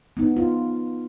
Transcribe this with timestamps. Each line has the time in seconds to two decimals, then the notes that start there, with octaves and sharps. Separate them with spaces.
0.17 B3 D#4
0.36 F4